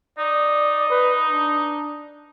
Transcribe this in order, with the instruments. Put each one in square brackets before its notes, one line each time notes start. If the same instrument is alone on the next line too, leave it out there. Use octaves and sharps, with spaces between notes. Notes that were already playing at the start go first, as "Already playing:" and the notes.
[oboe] D#4 [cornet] D5
[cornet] B4
D4